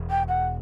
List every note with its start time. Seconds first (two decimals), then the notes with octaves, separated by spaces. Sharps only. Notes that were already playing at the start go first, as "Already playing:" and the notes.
Already playing: E1 E2 B2
0.10 G5
0.28 F#5